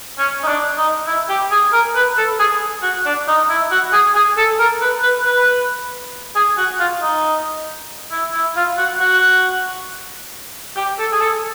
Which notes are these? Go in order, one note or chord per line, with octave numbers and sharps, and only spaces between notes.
C#4
D#4
D4
D#4
E4
G4
G#4
A#4
B4
A4
G#4
F#4
D4
D#4
E4
F#4
G#4
G#4
A4
A#4
B4
B4
B4
G#4
F#4
F4
D#4
E4
E4
F4
F#4
F#4
G4
A4
G#4
A4